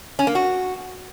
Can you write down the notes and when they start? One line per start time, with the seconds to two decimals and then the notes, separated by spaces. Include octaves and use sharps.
0.19 C#4
0.27 A#3
0.35 F#4